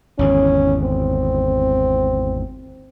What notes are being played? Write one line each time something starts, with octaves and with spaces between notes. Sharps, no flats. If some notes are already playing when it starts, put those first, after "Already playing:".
G#1 E2 D3 C#4
C4